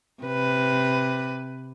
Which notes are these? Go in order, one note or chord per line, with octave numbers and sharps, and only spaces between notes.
C3 B4